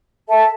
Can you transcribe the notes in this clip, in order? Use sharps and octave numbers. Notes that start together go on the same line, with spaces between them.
A4 E5 A5